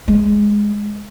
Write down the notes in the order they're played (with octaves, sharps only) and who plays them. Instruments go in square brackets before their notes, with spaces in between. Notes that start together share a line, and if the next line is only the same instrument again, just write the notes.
[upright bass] G#3